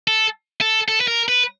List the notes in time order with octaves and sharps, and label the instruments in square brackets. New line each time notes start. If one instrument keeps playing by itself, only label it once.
[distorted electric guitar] A4
A4
A4
B4
A#4
B4